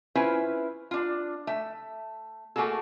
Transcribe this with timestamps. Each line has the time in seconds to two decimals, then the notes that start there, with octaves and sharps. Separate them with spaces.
0.15 C#4 E4 F4 B4 C5 E5
0.91 D4 F4
1.47 A3 E5
2.56 A3 A#3 F#4 G#4 A4